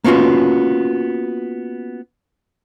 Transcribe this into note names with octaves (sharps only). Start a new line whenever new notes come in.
A#3 B3 C#4 F4 F#4